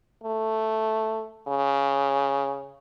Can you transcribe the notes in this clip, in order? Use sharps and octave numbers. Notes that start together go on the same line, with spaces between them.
A3
C#3